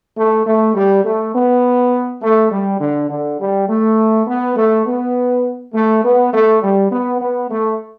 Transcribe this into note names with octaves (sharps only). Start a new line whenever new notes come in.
A3
A3
G3
A3
B3
A3
G3
D3
D3
G3
A3
B3
A3
B3
A3
B3
A3
G3
B3
B3
A3